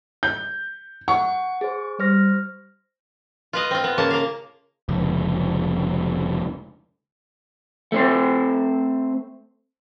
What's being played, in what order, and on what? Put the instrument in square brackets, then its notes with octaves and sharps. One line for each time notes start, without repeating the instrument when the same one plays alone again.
[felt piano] G6
[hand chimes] F#5 [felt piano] C#6
[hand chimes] G#4 C5
[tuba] G3 [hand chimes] C5 F6 A#6
[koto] F4 B4 D#5
C4 F4
B3
C#3 A#3 A5
A#3 F5
[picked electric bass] F1 C#2
[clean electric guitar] A3 C4 C5